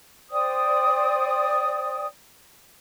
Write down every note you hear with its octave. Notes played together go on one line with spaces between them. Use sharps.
C5 D5 G5 D#6